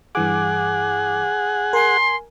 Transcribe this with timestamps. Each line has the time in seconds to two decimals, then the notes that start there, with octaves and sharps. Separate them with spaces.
0.15 G2 E3 G#4 F#5 D6
1.73 A#4 G#5 C6